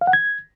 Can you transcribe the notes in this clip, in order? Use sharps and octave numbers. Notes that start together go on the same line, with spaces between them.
F5
F#5
G#6